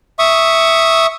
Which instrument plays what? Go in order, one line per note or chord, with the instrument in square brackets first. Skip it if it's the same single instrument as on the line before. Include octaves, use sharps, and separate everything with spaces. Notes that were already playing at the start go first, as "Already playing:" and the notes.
[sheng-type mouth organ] E5 C#6 D#6